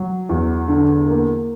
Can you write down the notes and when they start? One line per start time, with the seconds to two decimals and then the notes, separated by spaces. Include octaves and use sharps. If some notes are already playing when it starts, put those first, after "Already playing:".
Already playing: F#3
0.29 E2
0.68 D3
1.07 A#3